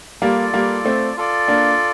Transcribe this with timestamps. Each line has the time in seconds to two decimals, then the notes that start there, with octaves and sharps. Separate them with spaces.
0.22 G3 A#3 F4 A4 D5
0.54 G3 A#3
0.85 A3 C4
1.17 F4 A4 D5
1.48 A#3 D4